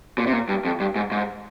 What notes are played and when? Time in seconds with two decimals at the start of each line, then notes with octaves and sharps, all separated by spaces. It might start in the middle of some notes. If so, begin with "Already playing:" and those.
0.18 A#2
0.27 C3
0.33 A#2
0.49 G2
0.65 F2
0.80 G2
0.96 G#2
1.12 G#2